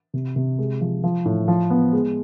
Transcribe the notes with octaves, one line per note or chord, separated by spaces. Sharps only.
C3
C3
G#3
F3
F3
A2
F3
B3
G#3